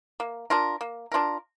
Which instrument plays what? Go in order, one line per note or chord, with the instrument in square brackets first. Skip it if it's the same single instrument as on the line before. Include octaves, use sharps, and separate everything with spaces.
[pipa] A#3
D4 F4 A#4
A#3
D4 F4 A#4